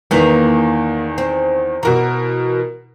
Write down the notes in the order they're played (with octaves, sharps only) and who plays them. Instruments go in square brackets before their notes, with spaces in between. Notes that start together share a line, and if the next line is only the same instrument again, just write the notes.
[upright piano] E2 D#3 [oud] A#3 E4 B4
[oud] C4
[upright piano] B2 A#4 A#5 [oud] E3 F#4